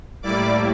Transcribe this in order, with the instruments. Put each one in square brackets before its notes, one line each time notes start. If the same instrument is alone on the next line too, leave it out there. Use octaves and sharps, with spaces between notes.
[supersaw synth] A2 G3 A#3 E4 D5 D6